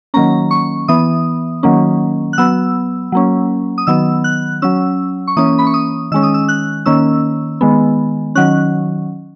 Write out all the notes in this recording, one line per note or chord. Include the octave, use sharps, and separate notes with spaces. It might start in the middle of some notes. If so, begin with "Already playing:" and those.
D#3 F#3 A#3 C#4 A#5
C#6
E3 B3 D#6
D#3 F#3 A#3 C#4
F#6
F#3 B3 E6
F#3 A#3 C#4
D#6
D#3 F#3 B3 E6
F#6
F#3 C#4 E6
C#6
E3 A#3 C#4 D#6
B5
C#6
D#6
D#3 G#3 C#4 E6
D#6
E6
F#6
D#3 A#3 C#4 E6
D#3 G#3 B3
D#3 F#3 C#4 F#6